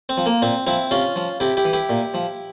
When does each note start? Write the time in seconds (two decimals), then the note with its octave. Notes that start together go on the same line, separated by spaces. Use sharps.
0.09 C4
0.18 F3
0.26 A#3
0.42 A#2 C4
0.67 F3 C4 E4
0.91 C3 C#4 F4
1.16 F3
1.40 C3 E4 G4
1.57 E4 G4
1.65 E3
1.73 E4 G4
1.90 A#2
2.14 F3